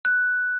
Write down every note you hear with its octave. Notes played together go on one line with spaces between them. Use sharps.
F#6